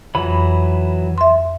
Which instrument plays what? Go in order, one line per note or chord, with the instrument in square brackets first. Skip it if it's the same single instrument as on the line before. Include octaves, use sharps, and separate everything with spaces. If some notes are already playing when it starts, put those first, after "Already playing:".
[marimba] F2 [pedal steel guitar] E3 F#3 B5
[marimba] E5 C6